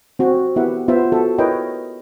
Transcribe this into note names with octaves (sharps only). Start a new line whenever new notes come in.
C4 F#4
B3 E4 G4 A#4 E5 F#5
B3 F4 C5 E5
F#4 A4 E5
E4 A#4 B4 C#5 D#5 G5